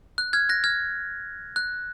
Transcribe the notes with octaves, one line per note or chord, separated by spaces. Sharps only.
F#6
F6 G#6
F#6 A#6
F6 G#6
F#6